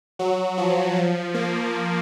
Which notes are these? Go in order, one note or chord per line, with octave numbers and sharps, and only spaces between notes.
F#3
F3
F3
A#3